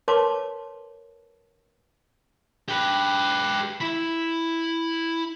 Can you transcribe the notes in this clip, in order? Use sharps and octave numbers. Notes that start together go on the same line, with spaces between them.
A#4 B4 C#5 A5 C6 D6
G4 B4
E4 B5